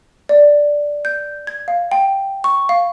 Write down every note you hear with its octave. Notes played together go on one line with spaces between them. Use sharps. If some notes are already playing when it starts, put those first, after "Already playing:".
D5
G6
G#6
F5
G5
C#6
F5